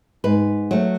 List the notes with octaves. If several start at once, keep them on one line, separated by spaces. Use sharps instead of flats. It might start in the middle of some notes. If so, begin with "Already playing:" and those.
G#2 B4
F#3 A3